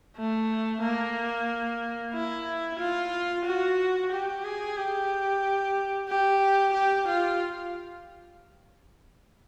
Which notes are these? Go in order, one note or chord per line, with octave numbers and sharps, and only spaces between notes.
A3
A#3
E4
F4
F#4
G4
G#4
G4
G4
G4
F4